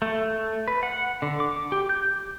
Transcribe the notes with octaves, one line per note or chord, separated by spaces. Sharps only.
A3
B4
F#5
D3
D6
G4
G6